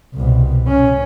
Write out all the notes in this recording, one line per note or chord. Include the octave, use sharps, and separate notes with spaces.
C2 B2
C#4